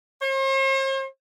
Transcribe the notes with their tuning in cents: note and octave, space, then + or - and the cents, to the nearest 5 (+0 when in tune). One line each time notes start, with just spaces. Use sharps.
C5 +45